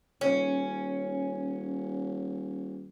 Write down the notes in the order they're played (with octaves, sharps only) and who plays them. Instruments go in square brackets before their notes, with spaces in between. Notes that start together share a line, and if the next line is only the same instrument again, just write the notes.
[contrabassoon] D#1 [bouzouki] C#4